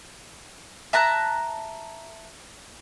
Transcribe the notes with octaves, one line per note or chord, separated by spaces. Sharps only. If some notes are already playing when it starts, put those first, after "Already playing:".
E5 A5 A#5 F#6